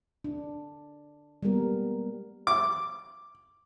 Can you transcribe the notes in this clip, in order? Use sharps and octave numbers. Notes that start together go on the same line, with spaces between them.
D4
G3 G#3 A#3 B3 A#4
D6